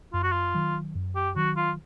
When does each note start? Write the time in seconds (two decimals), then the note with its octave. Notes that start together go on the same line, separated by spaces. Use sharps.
0.13 F#2 F4
0.23 F#4
0.32 F4
0.54 D#3 F#3
0.95 F#2
1.16 G4
1.36 D#3 F#3 F#4
1.56 F4